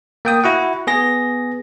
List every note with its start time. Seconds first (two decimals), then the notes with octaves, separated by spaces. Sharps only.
0.25 A#3 G5 D#6
0.44 E4 F#4 F#5
0.87 B3 G#4 A#6